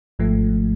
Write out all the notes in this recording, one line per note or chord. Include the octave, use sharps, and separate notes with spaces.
G#1 G#2 F3 A3